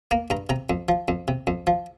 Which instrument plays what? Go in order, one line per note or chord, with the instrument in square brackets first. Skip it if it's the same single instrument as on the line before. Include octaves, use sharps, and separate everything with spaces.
[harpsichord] A#3 A#5
G2 A#5
C3 A#5
F2
F3
F2
C3
F2
F3